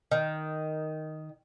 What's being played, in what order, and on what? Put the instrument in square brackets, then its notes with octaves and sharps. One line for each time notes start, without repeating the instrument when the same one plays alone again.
[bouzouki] D#3